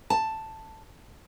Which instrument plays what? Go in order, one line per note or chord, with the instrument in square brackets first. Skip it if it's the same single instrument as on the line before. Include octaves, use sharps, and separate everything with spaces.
[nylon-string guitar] A5